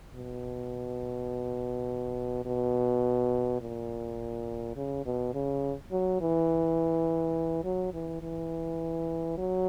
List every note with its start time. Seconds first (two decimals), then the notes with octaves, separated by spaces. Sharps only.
0.15 B2
2.45 B2
3.61 A#2
4.76 C#3
5.06 B2
5.34 C#3
5.92 F#3
6.21 E3
7.64 F#3
7.94 E3
8.22 E3
9.38 F#3